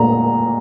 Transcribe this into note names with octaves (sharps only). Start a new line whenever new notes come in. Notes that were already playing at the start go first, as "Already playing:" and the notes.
Already playing: A#2 A#5